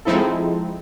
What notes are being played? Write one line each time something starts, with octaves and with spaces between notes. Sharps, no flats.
F3 G#3 C4 D#4 E4 A4